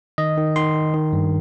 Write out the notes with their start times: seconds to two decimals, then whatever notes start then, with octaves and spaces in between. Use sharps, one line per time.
0.18 D#3 D#5
0.37 D#3
0.56 D#3 C6
0.75 D#3
0.94 D#3
1.13 G2